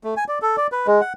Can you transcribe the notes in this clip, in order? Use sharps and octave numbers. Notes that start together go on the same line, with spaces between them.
A3
G#5
D5
A4
D5
B4
G#3
F#5